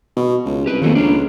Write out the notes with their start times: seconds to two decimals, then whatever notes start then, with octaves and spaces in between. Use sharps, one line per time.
0.16 B2
0.45 C#2
0.66 C2 G4 B4
0.81 F2 D#3 A3 A#3
0.95 C#2 D4 F4